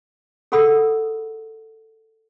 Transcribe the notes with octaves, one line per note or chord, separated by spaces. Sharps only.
G#4 A4 F#5 B5 D#6 E6